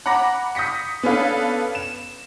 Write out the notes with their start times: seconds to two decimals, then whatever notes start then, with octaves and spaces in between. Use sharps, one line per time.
0.06 F#5 A#5 B5 D6 A#6
0.55 D#6 G6 A#6 B6 C#7
1.03 B3 C#4 D4 A4 B4 F5
1.75 E7